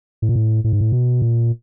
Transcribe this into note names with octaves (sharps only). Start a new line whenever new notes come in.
A2
A#2
A2
A2
G#2
A2
B2
A#2